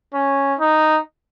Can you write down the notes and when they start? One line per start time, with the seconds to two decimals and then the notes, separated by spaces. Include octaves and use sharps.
0.14 C#4
0.59 D#4